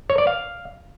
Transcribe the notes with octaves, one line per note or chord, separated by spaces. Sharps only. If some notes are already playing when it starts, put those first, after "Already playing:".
C#5
D5
F5